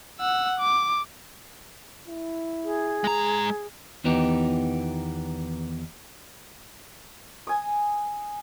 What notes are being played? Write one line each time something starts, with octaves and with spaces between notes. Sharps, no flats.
F#5 E6
D6
E4
G#4
G#3 A#5
E2 D#3 E3 B3 D#4 G4
G#5 D#6